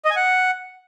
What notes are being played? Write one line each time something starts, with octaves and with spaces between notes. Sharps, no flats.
D#5
G#5
F#5